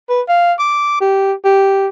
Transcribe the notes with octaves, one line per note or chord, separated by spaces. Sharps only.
B4
F5
D6
G4
G4